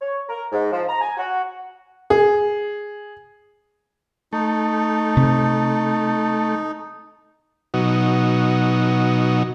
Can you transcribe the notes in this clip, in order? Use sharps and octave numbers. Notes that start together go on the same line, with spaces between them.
C#5
A#4
G#2
F3
A#5
G#5
F#4
G#4
A3 D#4
C3
B2 F#3 D#4